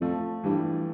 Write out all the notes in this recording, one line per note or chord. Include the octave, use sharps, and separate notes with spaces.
F2 F3 A3
G2 E3 G3